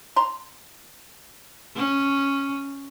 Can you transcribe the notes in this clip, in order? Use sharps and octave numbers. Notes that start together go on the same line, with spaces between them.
A#5 C6
C#4